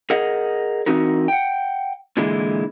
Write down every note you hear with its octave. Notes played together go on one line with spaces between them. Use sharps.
G#4 A#4 D#5 F#5
E3 C4 D#4 F#4 A#4
F#5 G5
A#2 D3 E3 G#3 E4